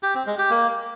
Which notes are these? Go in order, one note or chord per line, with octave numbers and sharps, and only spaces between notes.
G4
C4
G#3
G4
A#3